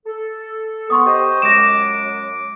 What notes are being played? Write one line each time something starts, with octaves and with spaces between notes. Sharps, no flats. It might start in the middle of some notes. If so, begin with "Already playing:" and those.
A4
B3 C6 C#6 D#6
G4 C5 D#5
F#2 G#3 D6 A#6 E7